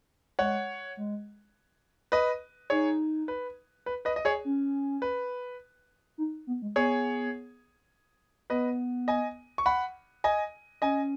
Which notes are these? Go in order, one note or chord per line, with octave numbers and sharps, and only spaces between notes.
G#3 C#5 F#5
G#3
B4 D#5
D#4 G#4 C#5
B4
B4
B4 D#5
D#5
G#4 C#5
C#4
B4
D#4
B3
G#3
B3 G#4 C#5
B3 B4 D#5
D#5 G#5
C#6
F#5 B5
D#5 G#5
C#4 D#5 G#5